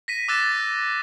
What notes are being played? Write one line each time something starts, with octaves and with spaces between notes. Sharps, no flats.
A#6 B6 D#7
D6 E6 F#6 A6 E7